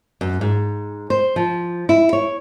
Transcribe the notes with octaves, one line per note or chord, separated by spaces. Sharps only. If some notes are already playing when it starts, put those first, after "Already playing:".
F#2
G#2
C5
F3
E4
C#5